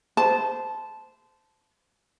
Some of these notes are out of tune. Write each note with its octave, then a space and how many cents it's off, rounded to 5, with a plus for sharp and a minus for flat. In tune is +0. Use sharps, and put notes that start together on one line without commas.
C5 -20 A5 -15